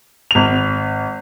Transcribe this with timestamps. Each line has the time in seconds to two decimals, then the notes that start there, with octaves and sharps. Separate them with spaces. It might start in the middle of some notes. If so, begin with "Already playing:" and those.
0.31 G#1 F7